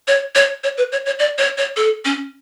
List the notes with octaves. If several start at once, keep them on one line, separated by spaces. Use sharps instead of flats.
C#5
C#5
C#5
B4
C#5
C#5
D5
C#5
C#5
A4
C#4